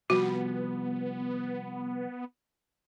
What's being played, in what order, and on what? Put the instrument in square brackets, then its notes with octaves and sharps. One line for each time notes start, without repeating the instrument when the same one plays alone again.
[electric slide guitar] C3 F3 G3 [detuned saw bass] B3 [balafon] F#4